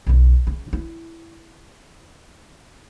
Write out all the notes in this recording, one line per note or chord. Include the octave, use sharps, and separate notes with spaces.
B1 C#3
C#3
E4